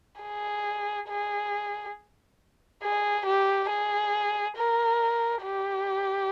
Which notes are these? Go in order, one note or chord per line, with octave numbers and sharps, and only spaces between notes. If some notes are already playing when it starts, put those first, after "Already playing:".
G#4
G#4
G#4
G4
G#4
A#4
G4